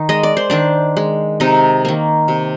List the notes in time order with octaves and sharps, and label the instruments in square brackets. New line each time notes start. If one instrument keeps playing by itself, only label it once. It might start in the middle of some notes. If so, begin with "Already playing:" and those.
Already playing: [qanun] D#3 D#4
G#3 D#5
D5
C5
D#3 D4 D5
G#3
C3 D#4 D#5
D#3 A#3
C3